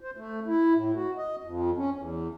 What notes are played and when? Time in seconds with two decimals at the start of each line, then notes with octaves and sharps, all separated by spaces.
0.01 C5
0.17 A3
0.47 E4
0.74 A2
0.94 F#4
1.17 D#5
1.43 F2
1.77 C#4
1.93 E2